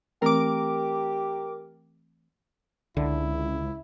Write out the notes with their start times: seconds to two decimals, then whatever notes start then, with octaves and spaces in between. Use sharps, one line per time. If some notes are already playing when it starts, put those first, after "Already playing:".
0.22 E3 A3 C4 G4 A#4 D6
2.97 C#2 D3 E4